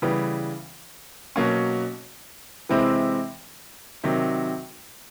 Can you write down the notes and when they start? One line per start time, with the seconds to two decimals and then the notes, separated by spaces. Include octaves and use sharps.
0.02 C#3 E3 G3 B3
1.36 B2 F#3 A#3 C#4
2.69 C3 E3 G#3 C4 E4
4.04 C3 D#3 F#3